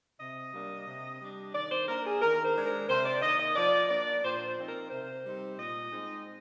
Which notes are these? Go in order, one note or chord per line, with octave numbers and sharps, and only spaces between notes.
C3 D#5
G3 A#3 D4
C3
G3 D4
D#3 D5
C5
A#3 D4 A#4
G#4
D#3 A#4
C5
G#3 D4
A#4
C3 C5
D5
D#3 A#3 D#5
D#5
F3 D5
A#3 D4 D5
A#2 C5
C5
F3 C4 D#4
A#4
C3 C5
G3 C4 D#4
A#2 D#5
G#3 C4 D#4